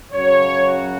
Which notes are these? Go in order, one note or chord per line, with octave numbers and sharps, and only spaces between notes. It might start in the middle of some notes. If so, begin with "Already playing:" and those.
F#2 C#3 F#3 C#5
F#4